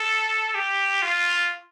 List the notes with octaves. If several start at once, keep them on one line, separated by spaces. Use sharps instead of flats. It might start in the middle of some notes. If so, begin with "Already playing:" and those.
Already playing: A4
G4
F4